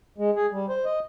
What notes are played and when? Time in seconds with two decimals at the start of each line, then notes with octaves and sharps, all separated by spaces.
0.18 G#3
0.36 G#4
0.52 G3
0.69 C5
0.85 D#5